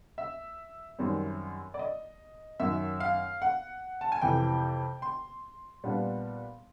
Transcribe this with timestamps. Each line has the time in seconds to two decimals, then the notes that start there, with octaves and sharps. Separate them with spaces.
0.18 E5
0.99 F#2 D#3 G3 C4
1.74 D5
1.79 D#5
2.60 F#2 D#3 F#3 E5
3.00 F5
3.42 F#5
4.01 A5
4.12 G#5
4.21 F2 C3 E3 G5
5.02 C6
5.84 A#2 G3 B3 D4